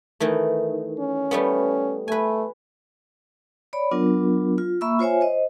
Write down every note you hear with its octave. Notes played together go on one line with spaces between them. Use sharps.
D#3 E3 A3
C#4
G3 A3 B3
A3 B4 G#5
C#5 D5 B5
F#3 B3 D4 F4 A#4
F4
A#3 E5 B5 C#6 E6
F4 C5 C#5 E5 G#5
C5 D#5